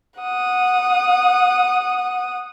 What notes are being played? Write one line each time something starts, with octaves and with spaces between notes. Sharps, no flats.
F#5 D#6